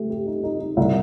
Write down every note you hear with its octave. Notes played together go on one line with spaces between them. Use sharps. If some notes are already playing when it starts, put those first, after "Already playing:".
Already playing: A3 G4
G4
D#4
D#4
D#4
C2